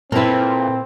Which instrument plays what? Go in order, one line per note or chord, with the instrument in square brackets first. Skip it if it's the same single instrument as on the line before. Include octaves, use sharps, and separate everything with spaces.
[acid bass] A#2 [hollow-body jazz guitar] A#3 E4 [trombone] C4 [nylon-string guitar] A4 B4